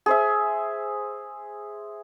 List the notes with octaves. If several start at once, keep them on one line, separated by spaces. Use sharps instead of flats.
G#4 C5 E5